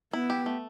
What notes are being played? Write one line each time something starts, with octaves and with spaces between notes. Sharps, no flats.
B3 E4
G4
A3